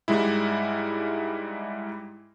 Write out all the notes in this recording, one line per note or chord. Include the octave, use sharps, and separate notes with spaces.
G#2 G3 G#3 E4